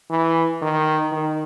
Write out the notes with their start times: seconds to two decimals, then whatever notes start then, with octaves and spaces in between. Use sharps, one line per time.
0.10 E3
0.62 D#3
1.12 D#3